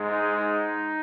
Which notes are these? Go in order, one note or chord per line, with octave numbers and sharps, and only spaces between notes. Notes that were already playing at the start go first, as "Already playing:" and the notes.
Already playing: G#2 G#3
D#4
D#4